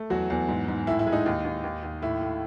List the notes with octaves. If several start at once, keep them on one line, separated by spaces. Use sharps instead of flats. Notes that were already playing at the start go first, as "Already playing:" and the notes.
Already playing: A3
E2 F#3 F#4
E2
G#2
G#2
A2 E4
E4
G#3
D#4
D#2
D#2
D#2
D#2
A2 E4
A2